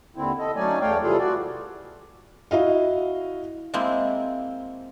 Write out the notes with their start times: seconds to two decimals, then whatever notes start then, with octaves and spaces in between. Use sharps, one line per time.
0.16 D#2 D3 C4 E4
0.39 A4 D#5
0.56 F#3 A3 C#4 D#4 D5 G#5
0.81 E2 A3 C#5 D5 F5 G5
1.02 C3 E3 G3 F4 G#4 A4
1.19 F#4 D5
2.51 E4 F#4 D#5 F5
3.74 G#3 A#3 C4 E4